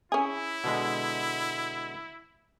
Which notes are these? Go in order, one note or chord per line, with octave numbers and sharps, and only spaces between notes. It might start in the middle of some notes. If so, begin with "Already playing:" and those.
C#4 E4 G#4
B2 D3 G#3